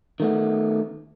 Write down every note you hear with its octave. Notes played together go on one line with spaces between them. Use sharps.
D#3 A3 B3